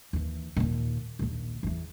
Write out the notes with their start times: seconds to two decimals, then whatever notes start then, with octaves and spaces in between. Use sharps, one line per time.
0.13 D#2 E3
0.56 D#2 A#2
1.19 A#1 D#2
1.63 E2 E3